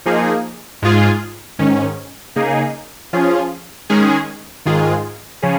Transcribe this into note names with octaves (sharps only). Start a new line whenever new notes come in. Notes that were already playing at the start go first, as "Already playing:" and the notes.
F3 A#3 D#4 G#4
G#2 G#3 F4 G#4
G#2 D#3 C#4
C#3 A#3 D#4 G#4
F3 C#4 F4 G#4
D#3 G#3 C#4 G#4
G#2 D#3 G#3 F4 G#4
C#3 F3 C#4 G#4